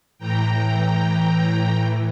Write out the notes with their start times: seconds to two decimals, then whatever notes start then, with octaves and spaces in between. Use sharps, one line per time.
0.18 A2 E3 G5 A#5
1.67 A2 E3